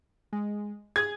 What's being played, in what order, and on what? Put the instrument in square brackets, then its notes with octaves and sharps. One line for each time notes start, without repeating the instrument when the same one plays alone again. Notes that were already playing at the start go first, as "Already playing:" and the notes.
[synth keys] G#3
[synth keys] G#4 [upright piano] G#6